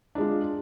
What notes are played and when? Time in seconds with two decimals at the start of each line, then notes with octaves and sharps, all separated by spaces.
0.15 D4
0.18 G#3
0.21 F4